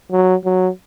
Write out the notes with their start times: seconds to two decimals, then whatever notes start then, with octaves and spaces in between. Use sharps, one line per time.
0.12 F#3
0.45 F#3